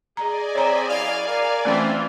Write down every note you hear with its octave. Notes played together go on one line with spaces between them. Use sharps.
G#4 D5 D#5 G#5 A#5
C4 C#5 E5 A#5
F#2 E4 F5
A#4 F5
E3 A3 C4 C#4 F4